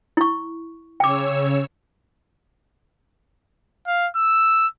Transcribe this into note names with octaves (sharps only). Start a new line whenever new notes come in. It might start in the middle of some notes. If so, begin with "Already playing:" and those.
E4 C#6
C#3 C#5 G5 D6 E6
F5
E6